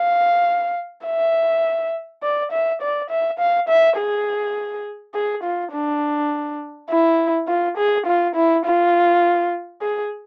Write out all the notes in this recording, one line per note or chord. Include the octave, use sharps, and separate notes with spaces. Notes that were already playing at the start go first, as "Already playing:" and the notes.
Already playing: F5
E5
D5
E5
D5
E5
F5
E5
G#4
G#4
F4
D4
E4
F4
G#4
F4
E4
F4
G#4